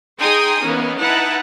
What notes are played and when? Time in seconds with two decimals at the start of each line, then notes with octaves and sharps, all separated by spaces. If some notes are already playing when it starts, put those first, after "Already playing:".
0.20 D#4 G#4 G5 G#5 C6 D#6
0.63 E3 A#3 B3 C#4 D#4
1.01 D#4 E4 B4 F#5 A5 A#5